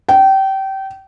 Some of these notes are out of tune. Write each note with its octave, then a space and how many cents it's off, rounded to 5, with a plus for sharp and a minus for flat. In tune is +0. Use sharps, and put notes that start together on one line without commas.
G5 -25